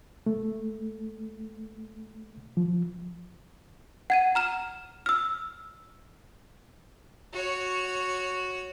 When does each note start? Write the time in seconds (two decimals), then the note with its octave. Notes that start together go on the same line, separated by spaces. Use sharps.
0.26 A3
2.57 F3
4.10 F#5 G#6 D#7
4.35 A#5 F6 E7
5.06 E6 F6
7.33 F#4 C#5